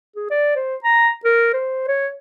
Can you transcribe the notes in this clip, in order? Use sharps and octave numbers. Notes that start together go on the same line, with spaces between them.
G#4
D5
C5
A#5
A#4
C5
C#5